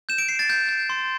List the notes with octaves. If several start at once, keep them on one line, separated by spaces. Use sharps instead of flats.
G6 E7
D7
G6 C7
A6
G6
G6
C6